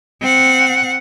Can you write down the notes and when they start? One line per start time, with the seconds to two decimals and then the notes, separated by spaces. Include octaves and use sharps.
0.21 C4 F#5